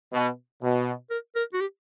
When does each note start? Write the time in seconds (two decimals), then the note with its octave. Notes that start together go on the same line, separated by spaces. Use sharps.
0.13 B2
0.62 B2
1.11 A#4
1.35 A#4
1.53 F#4
1.61 G4